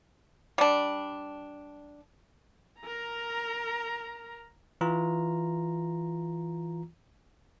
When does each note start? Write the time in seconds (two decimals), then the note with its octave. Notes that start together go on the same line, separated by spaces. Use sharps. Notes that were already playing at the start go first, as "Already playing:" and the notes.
0.58 G3 D4
2.81 A#4 A#5
4.81 E3 F4 A#5